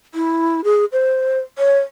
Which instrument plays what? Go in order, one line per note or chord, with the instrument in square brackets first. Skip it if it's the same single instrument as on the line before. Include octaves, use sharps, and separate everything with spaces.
[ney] E4
G#4
C5
C#5